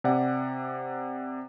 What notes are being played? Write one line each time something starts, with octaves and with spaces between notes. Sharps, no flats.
C3 D5 F#5